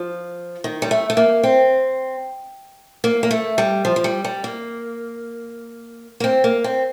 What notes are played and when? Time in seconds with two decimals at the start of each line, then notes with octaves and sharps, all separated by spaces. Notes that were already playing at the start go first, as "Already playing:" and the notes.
Already playing: F3
0.64 D#3
0.82 G3
0.91 A3
1.10 A3
1.17 A#3
1.43 C4
3.04 A#3
3.23 A#3
3.31 A3
3.58 G3
3.85 F3
3.96 F3
4.04 G3
4.24 G3
4.44 A#3
6.20 A#3
6.24 C4
6.44 A#3
6.64 C4